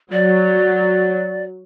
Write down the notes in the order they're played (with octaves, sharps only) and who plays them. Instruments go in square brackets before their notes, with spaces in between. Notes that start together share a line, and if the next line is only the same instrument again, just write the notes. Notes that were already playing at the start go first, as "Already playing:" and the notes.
[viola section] F#3 [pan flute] D5